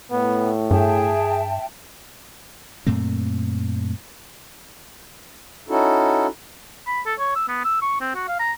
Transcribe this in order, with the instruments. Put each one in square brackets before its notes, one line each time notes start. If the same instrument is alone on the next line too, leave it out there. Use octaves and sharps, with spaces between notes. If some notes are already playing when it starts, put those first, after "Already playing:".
[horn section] A2 [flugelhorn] B3
[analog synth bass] G2 [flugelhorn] G#4 [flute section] E5 G5 A5
[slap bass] F#2 A#2 A3 C4
[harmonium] C#4 D#4 E4 F#4 A4
[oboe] B5
A4
C#5
E6
B3
E6
C#6
C4
F#4
F5
A#5